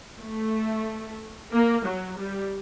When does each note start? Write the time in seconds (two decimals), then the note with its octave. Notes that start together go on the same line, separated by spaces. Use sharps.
0.19 A3
1.52 A#3
1.85 F#3
2.19 G3